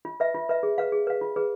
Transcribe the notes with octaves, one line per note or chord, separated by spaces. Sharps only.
F4
B4 E5
F4
B4 E5
G#4
B4 F5
G#4
B4 F5
F4
G#4 B4